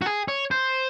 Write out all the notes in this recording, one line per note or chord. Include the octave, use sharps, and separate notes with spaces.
F#4
G#4
C#5
C5